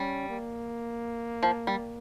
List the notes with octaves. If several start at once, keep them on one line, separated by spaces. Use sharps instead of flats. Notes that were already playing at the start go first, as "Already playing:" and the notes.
Already playing: G3 C#4
A#3
F3
G3